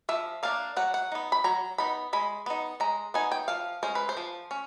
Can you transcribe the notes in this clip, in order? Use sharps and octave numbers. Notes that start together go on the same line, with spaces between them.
F3 E5
A#3 D4 F5
F#3 F#5
F#5
B3 D#4
B5
F#3 A#5
B3 D#4 B5
G#3 B5
B3 D#4
G#3 A#5
B3 D#4 G#5
G5
F3 F5
G#3 C#4 C5
B4
C5
F3
C#4